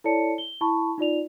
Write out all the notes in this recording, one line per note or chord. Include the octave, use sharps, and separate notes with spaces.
E4 A4 C#5 D5 A5 C#7
G7
E4 A5 B5 C#6
D#4 F4 D5 F7